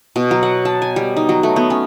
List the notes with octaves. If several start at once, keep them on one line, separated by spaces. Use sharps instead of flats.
B2
F#3
F#5
A5
G#5
G3
D#4
F#3
A3
B3
C#4